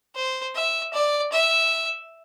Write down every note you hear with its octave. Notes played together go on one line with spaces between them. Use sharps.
C5
E5
D5
E5